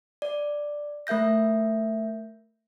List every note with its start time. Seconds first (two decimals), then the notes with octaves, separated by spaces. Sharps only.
0.22 D5
1.07 A3 A#4 E5 G6 A#6